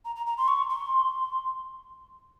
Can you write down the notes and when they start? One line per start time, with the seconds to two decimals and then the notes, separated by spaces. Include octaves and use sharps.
0.05 A#5
0.15 A#5
0.26 A#5
0.37 C6
0.47 C#6
0.69 C6